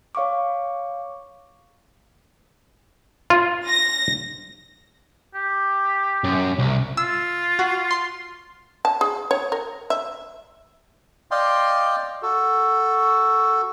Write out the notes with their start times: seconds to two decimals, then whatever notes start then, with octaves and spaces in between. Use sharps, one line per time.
0.15 C#5 F5 C#6 D6
3.30 F4
3.67 A#6
5.35 G4
6.24 F#2
6.59 C2
6.97 F4 E6
7.59 F#4
7.91 C6 C7
8.85 A5
9.01 G#4
9.31 C#5
9.52 A#4
9.90 E5
11.31 D5 D#5 F5 G5 C6
12.22 F#4 A4